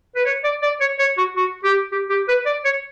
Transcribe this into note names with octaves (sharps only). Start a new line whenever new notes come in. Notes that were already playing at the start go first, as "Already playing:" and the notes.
B4
C#5
D5
D5
C#5
C#5
F#4
F#4
G4
G4
G4
B4
D5
C#5